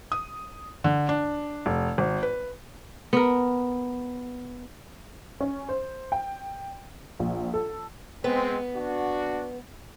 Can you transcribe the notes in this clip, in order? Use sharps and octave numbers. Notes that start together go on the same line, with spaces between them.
D#6
D3
D4
F1
G#1
B4
B3 A#4
C#4
C5
G5
A#1
A4
G#3 B3 C4 B4
D4 F#4